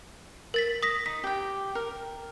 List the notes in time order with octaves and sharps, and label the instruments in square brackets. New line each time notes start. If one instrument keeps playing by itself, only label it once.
[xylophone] A#4 A6 B6
D#6 A#6 B6
[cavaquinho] D#4 [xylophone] B6
[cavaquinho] G4 G5
A#4